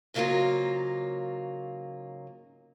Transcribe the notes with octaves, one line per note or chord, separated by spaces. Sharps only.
G#2 C#3 F#3 G#3 A#3 F4